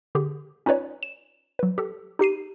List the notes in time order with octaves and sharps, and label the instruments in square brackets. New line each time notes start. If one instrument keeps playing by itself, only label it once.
[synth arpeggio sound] D3 G4 G#4
C#4 D#4 F4 B4 C#5 D5
E7
F#3 B4
G4 A4
D#4 G4 C7 D#7